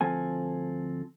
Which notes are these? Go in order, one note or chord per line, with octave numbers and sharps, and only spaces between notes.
D2 F3 C4 A4 G#5